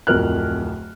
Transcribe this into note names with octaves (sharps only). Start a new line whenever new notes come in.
D1 F2 A#4 F6 F#6